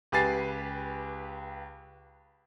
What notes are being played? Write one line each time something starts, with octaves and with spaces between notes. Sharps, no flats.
C#2 G4 B4 G#5 A6 C7